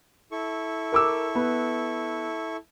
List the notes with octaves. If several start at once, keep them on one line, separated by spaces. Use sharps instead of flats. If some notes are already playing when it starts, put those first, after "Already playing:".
E4 A4 C#6
A#4 D6 E6
B3